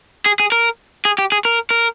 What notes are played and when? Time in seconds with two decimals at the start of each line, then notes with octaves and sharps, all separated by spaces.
0.26 G#4
0.40 G#4
0.52 A#4
1.05 G#4
1.18 G4
1.32 G#4
1.45 A#4
1.70 A#4